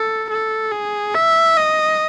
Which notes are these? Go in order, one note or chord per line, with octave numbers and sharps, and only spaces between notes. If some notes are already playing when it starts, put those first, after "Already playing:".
Already playing: A4
A4
G#4
E5
D#5